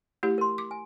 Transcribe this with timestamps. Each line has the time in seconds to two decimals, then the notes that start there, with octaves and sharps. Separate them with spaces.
0.23 A3 E4 G4
0.38 A#4 C6
0.58 D6
0.71 G#5